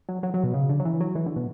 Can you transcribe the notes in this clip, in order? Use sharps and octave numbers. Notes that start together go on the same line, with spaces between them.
F#3
F#3
F#3
B2
C#3
D3
F#3
E3
F#3
E3
D3
B2